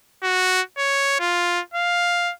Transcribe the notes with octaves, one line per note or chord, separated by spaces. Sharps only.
F#4
C#5
F4
F5